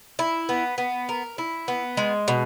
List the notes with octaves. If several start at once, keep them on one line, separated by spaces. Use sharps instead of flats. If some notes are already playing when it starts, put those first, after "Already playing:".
E4
B3
B3
A#4
E4
B3
G#3
B2